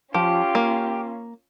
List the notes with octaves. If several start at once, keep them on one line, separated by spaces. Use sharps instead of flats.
F3 C#4 F4 G4
A#3